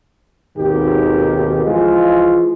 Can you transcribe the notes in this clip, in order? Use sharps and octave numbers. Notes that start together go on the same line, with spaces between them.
G#1 D#2 G#2 B2 D#3 G4
E3 F3 G#3 F4